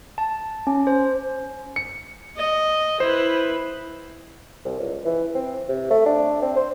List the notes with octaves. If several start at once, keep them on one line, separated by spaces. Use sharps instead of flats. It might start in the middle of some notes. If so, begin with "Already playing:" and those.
A5
C#4
C5
C#7
D#5
E4 B4 C5
C2
C#2
E3
C4
C3
A3
D4
C4
C5